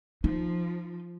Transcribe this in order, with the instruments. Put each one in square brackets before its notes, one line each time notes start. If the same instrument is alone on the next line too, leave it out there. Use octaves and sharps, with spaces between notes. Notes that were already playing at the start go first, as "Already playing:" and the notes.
[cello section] F3 [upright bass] D#4